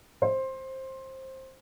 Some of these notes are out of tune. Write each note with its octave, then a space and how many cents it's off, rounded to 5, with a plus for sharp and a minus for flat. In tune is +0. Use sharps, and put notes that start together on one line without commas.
C5 +15